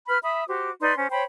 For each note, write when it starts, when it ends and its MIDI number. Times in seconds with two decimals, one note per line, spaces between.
0.07 0.18 71
0.07 0.18 83
0.07 0.18 89
0.23 0.44 76
0.23 0.44 83
0.23 0.44 87
0.49 0.70 66
0.49 0.70 67
0.49 0.70 72
0.49 0.70 86
0.81 0.94 63
0.81 0.94 71
0.81 0.94 74
0.81 0.94 84
0.97 1.08 61
0.97 1.08 72
1.11 1.22 72
1.11 1.22 73
1.11 1.22 79
1.11 1.22 83